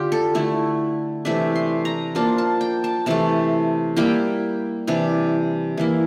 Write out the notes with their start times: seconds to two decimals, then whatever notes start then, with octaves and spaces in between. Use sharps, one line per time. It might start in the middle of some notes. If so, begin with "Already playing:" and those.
Already playing: D3 F4 G4
0.12 A4
0.35 D3 A3 E4
1.25 C3 E3 A3 D4 E5
1.55 C6
1.85 A#5
2.15 F3 A#3 D4 F4 A5
2.38 A5
2.61 G5
2.84 A5
3.06 C3 E3 A3 A5
3.96 G3 A#3 E4 G5
4.87 C3 E3 G3 D4
5.77 E3 A#3 E4